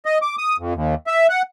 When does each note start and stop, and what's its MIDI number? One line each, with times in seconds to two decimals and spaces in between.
0.05 0.18 75
0.22 0.36 86
0.38 0.57 87
0.59 0.74 41
0.75 0.95 39
1.07 1.27 76
1.29 1.42 78